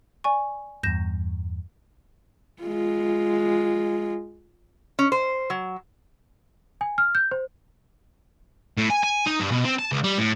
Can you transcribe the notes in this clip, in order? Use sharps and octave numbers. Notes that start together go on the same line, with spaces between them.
D5 G#5 C#6
E2 G2 G6 A#6 E7
G#3 F4
C#4
C5
F#3
G#5
F6
G6
C5
A2
G#5
G#5
D#4
G2
B2
C4
A5
C#2
G3
A2